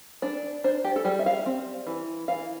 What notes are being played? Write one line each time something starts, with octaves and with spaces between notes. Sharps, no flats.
D4 D5
D4 C5
G4
A4
G3 G4
E5
F5
C4
E3
E3 F5